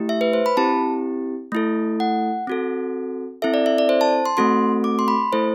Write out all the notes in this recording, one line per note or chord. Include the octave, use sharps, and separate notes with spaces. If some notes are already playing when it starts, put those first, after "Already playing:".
Already playing: A3 E4 G4
E5
B4
C5
B5
C4 E4 G4 A5
A3 E4 A4
F#5
C4 F#4 A4
C4 E4 A4 E5
D5
E5
D5
C5
A5
C6
A3 C4 F#4 A4 C6
D6
C6
B5
A3 E4 A4 C5